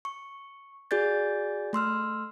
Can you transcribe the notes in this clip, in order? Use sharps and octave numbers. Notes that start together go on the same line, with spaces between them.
C#6
F#4 G#4 D5 G6 A6
A3 C6 E6 F6